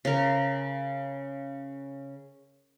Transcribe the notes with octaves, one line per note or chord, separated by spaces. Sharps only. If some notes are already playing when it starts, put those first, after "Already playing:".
C#3 A#4